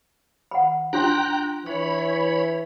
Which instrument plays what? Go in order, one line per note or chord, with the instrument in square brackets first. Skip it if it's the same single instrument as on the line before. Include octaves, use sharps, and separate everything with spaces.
[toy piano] F#5 B5
[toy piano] D4 F4 C6 [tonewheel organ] G5 A#5 F#6
[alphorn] E3 [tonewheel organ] C#5 B5